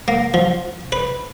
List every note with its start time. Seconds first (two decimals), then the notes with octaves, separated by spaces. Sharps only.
0.08 A#3
0.34 F3
0.92 B4